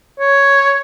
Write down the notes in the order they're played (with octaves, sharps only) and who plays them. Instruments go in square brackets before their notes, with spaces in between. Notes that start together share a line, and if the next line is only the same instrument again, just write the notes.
[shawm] C#5